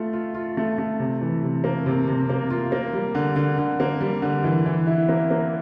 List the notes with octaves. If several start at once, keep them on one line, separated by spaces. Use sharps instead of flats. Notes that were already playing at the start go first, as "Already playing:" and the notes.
Already playing: A3 F4
F4
F4
A3
A3
C3
E3
C3
A#3
C3
C3
A#3
F4
A#3
G3
D3
D3
D3
A#3
G3
D3
E3
E3
E4
A#3
A#3